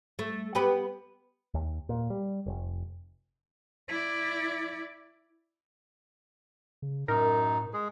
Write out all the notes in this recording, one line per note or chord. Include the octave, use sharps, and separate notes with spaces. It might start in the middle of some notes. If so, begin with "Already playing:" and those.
A3
B3 G4 B4
D#2
A#2
G3
F1
E4 D5
C#3
F#2 A2 D#4 A#4
G#3 G#4